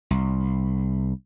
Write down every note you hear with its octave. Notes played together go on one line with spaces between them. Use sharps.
C2